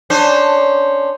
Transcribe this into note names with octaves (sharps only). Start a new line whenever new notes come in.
C#4 D4 C5